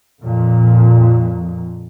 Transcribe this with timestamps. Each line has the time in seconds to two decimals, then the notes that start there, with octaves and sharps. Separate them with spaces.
0.23 F2 A#2